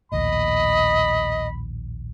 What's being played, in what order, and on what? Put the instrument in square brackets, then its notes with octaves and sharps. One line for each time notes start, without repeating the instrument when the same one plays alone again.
[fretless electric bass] A#1 D#2 A2 [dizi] D#5 [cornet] B5